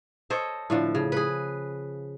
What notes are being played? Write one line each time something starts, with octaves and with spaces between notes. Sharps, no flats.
A4 C5 C#5 D#5
A2 D3 F3
C#3
G#4 B4